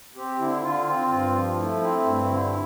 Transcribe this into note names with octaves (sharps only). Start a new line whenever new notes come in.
C4 G4
D3 E4
D3 F4
C4 F4
G2 F4
F3 F4
A3 E4
C4
G2
D3